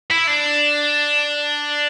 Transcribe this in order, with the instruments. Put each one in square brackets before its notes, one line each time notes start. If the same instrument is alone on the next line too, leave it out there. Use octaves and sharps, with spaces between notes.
[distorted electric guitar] E4
D4